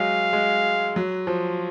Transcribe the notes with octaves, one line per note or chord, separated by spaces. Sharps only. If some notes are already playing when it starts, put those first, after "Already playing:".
Already playing: F#3 G#3 F5
G#3
F#3
F3